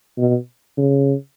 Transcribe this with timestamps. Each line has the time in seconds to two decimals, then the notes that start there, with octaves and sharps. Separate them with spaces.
0.18 B2
0.77 C#3